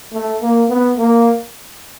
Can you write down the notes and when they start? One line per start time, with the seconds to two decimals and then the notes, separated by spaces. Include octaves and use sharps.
0.13 A3
0.42 A#3
0.69 B3
0.98 A#3